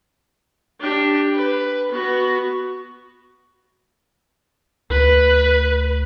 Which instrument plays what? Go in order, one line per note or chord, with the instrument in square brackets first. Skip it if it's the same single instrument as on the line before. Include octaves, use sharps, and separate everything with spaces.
[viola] D4 G4
B4
B3 F#4
[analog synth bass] D2 [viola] B4